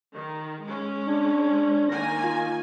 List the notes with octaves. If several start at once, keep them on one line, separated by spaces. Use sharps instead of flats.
D#3
G#3 C#4
D4
D#3 A#3 G#5 A#6
F4